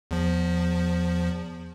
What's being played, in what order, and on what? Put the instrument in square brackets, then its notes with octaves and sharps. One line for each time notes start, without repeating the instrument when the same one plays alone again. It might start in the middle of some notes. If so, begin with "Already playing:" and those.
[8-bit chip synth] E2 F3